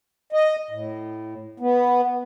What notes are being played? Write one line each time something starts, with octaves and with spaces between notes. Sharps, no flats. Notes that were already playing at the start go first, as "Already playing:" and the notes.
D#5
A2
B3